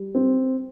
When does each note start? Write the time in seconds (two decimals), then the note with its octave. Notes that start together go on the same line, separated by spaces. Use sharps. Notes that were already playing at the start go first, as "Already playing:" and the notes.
Already playing: G3
0.15 C4